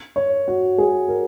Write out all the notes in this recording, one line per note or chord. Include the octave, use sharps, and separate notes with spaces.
C#5
F#4
G#4
A#4